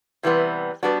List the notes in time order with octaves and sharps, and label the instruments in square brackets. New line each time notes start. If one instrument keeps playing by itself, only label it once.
[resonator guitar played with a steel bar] C3 E3 G3 B3
G3 B3 D4 F#4